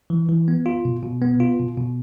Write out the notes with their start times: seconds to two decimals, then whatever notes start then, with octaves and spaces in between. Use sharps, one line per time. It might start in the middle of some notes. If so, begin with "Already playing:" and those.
0.10 E3
0.29 E3
0.48 B3
0.66 F4
0.85 B2
1.03 B2
1.21 B3
1.40 F4
1.59 B2
1.78 B2